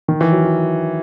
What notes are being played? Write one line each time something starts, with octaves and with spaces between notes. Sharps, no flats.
D#3
E3
F#3
F#3